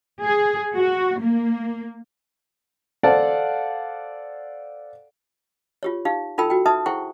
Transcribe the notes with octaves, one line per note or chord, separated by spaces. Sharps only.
G#4
F#4
A#3
A4 C5 D5 F5 F#5 A5
F4 G4 C#5
D#4 G4 F5
D#4 F4 A4 G5 B5 E6
F#4 G5
D#4 B4 E5 A5 D#6
E4 G#4 C5 F#5 G5 C#6